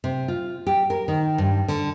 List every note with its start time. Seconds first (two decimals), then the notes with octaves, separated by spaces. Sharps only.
0.04 C3
0.28 F4
0.67 G4
0.90 A#4
1.08 D#3
1.38 G2
1.68 D3